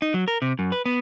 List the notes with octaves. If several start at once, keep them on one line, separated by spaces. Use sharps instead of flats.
D#4
F#3
A#4
C3
F#2
B4
B3